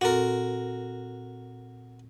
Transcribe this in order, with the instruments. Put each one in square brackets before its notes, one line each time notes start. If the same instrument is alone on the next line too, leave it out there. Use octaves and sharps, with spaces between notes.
[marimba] A#2 C4 A4 [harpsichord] F#4 A#4